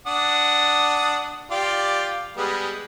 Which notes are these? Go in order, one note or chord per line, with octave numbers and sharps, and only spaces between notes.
D4 F#5 D#6
F4 G4 D5
G3 G#3 B3